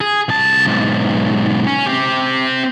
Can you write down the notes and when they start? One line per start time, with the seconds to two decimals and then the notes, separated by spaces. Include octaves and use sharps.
0.01 G#4
0.29 C2 A5
0.67 B1 G#2
1.67 C#4
1.86 C4 G4